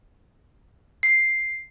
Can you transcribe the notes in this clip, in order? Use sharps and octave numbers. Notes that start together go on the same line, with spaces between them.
C7